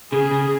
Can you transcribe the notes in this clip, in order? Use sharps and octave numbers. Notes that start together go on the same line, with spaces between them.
C#3 G#4
C#3